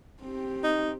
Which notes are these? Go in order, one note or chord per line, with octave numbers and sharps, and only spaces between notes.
C4 G4
D#4